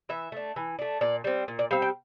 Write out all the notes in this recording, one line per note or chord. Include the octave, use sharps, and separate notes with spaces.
E3 E5
A3 D4
E3
A3 D4
A#2 D5
G3 C4
A#2
D5
G3 C4 F5
G5